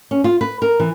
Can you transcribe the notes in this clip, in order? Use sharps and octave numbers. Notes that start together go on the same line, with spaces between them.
C#4
F4
B4
A#4
E3